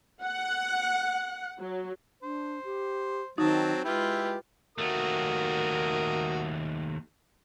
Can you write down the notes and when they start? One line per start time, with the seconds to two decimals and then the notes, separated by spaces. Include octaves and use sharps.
0.23 F#5
1.59 F#3
2.23 D4 C5
2.64 G4
3.38 D#3 F#3 C4 D#4 A5
3.84 G#3 E4 F4 G4 B4
4.78 D#2 A3 F#4 A#4 D#6